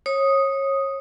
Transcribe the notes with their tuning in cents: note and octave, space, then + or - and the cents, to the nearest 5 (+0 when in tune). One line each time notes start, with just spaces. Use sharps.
C#5 -25 D#6 +0